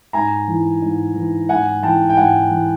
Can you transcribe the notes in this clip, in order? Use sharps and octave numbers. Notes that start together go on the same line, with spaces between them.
G#2 G#5 A#5
E3
G#2
E3
G#2 F#5 G#5
E3 G5 A5
G5
G#2 F#5 G#5
E3